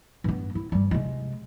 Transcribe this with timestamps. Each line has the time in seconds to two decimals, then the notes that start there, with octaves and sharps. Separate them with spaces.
0.24 G2 B3
0.55 E4
0.72 G2 G3
0.91 C3 G#3